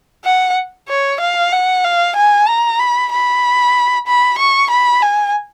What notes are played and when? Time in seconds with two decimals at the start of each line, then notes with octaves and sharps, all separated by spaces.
0.24 F#5
0.88 C#5
1.21 F5
1.53 F#5
1.84 F5
2.16 G#5
2.48 A#5
2.80 B5
3.12 B5
4.07 B5
4.39 C#6
4.70 B5
5.02 G#5